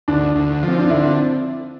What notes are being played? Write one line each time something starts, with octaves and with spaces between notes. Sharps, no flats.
D2 D4
D2
F3 C4
D4
D3 C4 E4